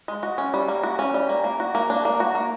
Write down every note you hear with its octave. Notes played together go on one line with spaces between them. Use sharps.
G#3
F#4
C#4
G3
A#3
F#4
C#4
G3
A#3
A#3
F#4
A#3
D4
A#3
F#4
A#3